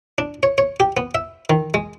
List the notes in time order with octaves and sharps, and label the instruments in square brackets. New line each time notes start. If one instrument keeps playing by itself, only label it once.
[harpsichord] D4
C#5
C#5
G4
B3
E5
D#3
G#3